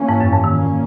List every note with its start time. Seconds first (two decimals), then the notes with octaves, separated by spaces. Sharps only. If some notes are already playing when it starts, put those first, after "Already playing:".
Already playing: E3 A#3 C#4
0.09 G#2
0.21 F#2
0.32 G#2
0.44 A#2 D#3 A#3 C#4